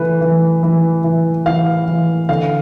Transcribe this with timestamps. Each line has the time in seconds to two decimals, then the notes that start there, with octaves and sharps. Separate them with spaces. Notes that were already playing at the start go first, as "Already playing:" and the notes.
Already playing: E3 A3 B4
0.21 E3
0.63 E3
1.04 E3
1.46 E3 F5
1.88 E3
2.29 D3 F5